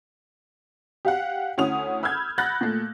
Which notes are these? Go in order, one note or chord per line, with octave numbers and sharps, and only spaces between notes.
G4 F5 F#5
D2 C#4 E4 D#6 F7
B5 E6 F6 G6 G#6
F#5 B5 F#6 G6 A6 A#6
A#2 A3